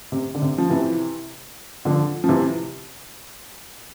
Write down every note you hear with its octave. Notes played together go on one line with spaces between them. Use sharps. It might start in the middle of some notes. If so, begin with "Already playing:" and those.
C3
D3
C3
F3
C3 E3
D3 F3
F3
C3 E3